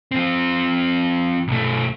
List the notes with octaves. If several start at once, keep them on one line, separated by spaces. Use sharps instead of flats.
F3 C4
B1 A3